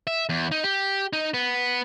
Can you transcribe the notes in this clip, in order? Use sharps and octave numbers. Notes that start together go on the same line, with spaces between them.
E5
E2
D#4
G4
D#4
B3